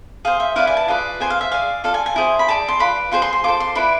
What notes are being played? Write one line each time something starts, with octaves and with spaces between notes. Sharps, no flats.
G#4 C5 F5
E5
E4 B4 D5 F5
G#5
A5
F4 G#4 B4 D5
G#4 C5 G#5
F5
E5
G#4 D5 F5
F4 A4 D5 F5
G#5
G#5
E4 G#4 C5
B5
G#4 D5 A5
C6
F4 B4 D5 B5
F4 G#4 C5 C6
C6
C6
F4 A4 C5 D6
C6
E4 B4 D5 B5